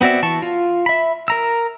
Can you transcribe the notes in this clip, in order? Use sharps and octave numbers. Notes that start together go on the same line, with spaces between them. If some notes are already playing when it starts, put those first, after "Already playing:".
B3 C4 F#4 D5 E5
E3 A5 C#6
F4
E5 B5
A#4 A#5 E6